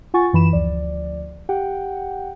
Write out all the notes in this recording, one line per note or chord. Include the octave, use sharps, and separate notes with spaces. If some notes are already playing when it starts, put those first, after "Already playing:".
F4 F#5 G#5 C#6 A6
F#2 E3 B5 E7
D2 F3 D5
G4 F#5 G5